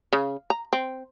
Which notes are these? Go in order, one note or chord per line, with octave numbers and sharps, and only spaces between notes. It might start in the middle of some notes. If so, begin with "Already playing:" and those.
C#3
A#5
C4